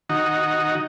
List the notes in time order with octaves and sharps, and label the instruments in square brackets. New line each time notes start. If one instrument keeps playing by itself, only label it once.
[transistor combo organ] D#3 D#4 F#4